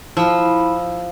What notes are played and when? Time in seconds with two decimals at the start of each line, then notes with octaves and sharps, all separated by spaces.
0.17 F3 E4 B5